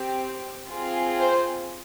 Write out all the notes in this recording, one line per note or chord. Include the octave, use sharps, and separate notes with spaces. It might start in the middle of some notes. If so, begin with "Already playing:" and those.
Already playing: C4 G4
C4 F4 G#4
C5